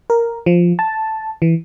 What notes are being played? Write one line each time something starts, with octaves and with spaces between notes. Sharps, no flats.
A#4
F3
A5
E3